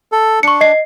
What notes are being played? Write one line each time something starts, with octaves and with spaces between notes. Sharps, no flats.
A4
D4 C#6 C#7
D#5 C7